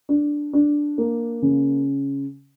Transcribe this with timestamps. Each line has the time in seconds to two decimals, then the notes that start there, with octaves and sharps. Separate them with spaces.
0.09 D4
0.53 D4
0.98 A#3
1.42 C#3